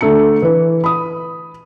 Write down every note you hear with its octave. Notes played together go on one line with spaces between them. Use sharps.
D3 A3 A#5 C#7
E3 B4
B5 D#6